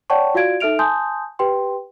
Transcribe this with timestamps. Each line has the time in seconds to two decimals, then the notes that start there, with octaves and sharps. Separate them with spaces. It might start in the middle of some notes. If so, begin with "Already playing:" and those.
0.10 C#5 D5 F#5 G5 A5 C#6
0.35 F4 F#4 D5 F5 G#6 D7
0.60 D#4 A4 E5 F6 D7 F7
0.79 G#5 A5 C6 D#6 G6
1.39 G4 B4 G5 C6